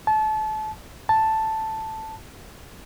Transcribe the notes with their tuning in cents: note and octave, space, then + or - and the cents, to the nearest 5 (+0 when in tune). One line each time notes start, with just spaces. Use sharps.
A5 -30
A5 +0